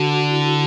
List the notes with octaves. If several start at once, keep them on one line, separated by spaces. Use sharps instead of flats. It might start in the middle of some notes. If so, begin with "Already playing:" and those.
Already playing: D3 F#4
E4